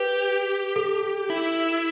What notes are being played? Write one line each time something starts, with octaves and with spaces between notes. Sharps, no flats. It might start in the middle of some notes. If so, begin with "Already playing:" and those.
Already playing: G4 B4
A4
E4